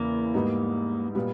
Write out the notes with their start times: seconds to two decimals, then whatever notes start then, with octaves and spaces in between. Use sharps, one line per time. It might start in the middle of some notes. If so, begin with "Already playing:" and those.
Already playing: E2 C#3 E3 A#3
0.34 G#2 G3 B3 D#4
1.15 A#2 G3 B3